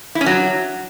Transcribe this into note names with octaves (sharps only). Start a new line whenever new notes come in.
E4
C#4
F#3